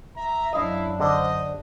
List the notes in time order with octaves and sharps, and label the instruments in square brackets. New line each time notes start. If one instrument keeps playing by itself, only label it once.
[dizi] E5 [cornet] A#5
[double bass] F#2 D4 [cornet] E4 [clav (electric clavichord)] D#5 [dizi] F5
[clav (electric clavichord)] D3 [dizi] C5 [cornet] D#5